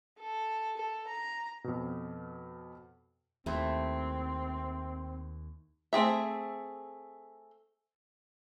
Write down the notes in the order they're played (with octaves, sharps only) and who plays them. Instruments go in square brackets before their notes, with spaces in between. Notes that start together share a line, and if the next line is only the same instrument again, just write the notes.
[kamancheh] A4
A4
A#5
[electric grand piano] F2 B2
[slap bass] D#2 [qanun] A3 E4 [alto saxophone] C4
[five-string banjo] A3 C4 G#4 E5